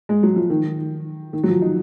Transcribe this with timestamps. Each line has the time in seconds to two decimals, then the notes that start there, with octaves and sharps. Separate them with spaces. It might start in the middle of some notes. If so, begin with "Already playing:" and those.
0.09 G#3
0.23 F#3
0.36 F3
0.50 D#3
1.33 D#3
1.44 F#3
1.48 F3
1.62 D#4